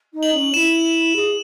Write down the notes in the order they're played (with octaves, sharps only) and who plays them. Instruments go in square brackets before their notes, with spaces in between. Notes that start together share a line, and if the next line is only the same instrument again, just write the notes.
[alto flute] D#4
[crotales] F#7
[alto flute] C#4
[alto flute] E4 [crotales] E7
[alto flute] G#4